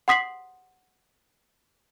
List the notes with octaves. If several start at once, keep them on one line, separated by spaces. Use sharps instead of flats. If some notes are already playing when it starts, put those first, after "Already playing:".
F#5 C6 D#6 B6 C7 F#7